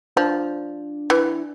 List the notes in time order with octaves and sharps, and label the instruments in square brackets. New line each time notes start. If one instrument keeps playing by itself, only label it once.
[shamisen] F3 [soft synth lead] D4
[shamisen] E3